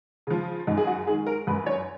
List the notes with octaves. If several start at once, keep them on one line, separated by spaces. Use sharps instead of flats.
C#3 F3
F#2 D#4
G#4
F#4
D#3 G#3 G#4
A#4
F#2 B4
C#5